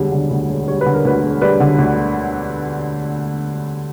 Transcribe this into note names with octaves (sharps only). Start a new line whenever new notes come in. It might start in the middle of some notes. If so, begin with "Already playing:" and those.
Already playing: E1 D2 D3 G3
D3
D2
E1
G3 C#5
B4
D3
A#4
D2 B4
E1
G3 B4 D5
D3
D2